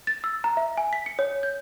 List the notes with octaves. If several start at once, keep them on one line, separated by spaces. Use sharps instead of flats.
A6
E6
A#5
E5
G#5
B6
C#7
C#5
G6